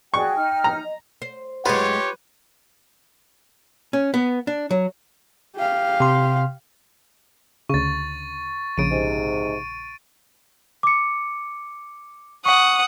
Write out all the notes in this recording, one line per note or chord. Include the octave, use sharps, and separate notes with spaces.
F#4 G#4 D5 G5 C#6
D#4 F6
A#5
D#5
C5
F#2 G#3 F4 G4 B4 C#5
C#4
B3
D4
F#3
G4 F5
C3 C6
D2 C#3 C#6 A6
A#1 C#3 D7 D#7
G#2 C3
D6 C#7
F#5 C#6 D#6